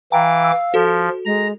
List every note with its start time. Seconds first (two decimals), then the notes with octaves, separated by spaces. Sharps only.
0.12 E3 F5 G5 G#5 A#5 D6
0.44 E6
0.74 F3 F#4 A4
1.25 G#3 A#5